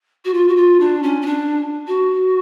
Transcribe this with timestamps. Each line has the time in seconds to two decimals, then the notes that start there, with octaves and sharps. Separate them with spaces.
0.24 F#4
0.33 F4
0.48 F#4
0.56 F4
0.79 D4
1.02 C#4
1.21 C#4
1.26 D4
1.87 F#4